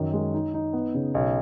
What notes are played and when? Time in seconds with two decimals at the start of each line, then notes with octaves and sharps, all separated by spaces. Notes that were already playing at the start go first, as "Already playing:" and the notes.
Already playing: F#2 D#3
0.13 G#3
0.34 D#4
0.54 D#4
0.73 B3
0.94 C#3
1.14 B1